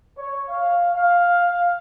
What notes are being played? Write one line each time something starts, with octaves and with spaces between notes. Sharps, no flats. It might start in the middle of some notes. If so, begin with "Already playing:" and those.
C#5
F5
F5